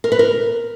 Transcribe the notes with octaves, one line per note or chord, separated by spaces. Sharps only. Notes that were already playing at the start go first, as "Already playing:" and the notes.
A#4
B4
A#4